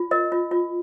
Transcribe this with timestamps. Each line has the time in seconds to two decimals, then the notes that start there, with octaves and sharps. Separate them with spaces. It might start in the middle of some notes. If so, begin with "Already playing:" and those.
Already playing: F4
0.11 A#4 D#5
0.32 F4
0.51 F4